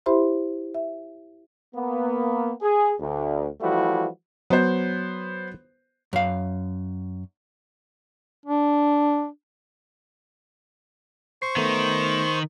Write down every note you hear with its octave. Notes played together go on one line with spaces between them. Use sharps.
E4 G4 C5 E5 B5 C6
E5
A#3 B3
G#4
D2
E3 F3 G3 A3 E4 F#4
F#3 B3 C5
F#2 F5
D4
C5 C#6 C7
D#3 A3 B3